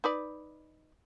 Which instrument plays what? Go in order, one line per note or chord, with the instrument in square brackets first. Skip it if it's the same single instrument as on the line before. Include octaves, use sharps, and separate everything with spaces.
[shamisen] D#4 B4 D5